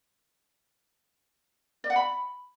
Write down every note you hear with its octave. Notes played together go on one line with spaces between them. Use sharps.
D5
F#5
B5